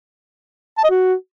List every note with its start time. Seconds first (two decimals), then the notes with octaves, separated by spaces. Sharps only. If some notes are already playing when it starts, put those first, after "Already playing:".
0.77 A5
0.84 D#5
0.90 F#4